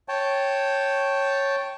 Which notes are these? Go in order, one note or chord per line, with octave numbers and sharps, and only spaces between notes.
C#5 G5 A5